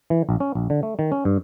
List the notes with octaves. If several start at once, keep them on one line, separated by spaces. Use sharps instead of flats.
E3
A#1
C#4
A#1
D3
A3
D#3
C#4
G2